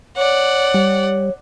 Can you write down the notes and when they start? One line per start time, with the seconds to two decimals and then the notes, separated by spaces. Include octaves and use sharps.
0.17 C#5 D5 F#5
0.74 G3